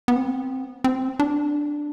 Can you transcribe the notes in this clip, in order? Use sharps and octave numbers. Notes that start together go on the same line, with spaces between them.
B3
C4
C4
D4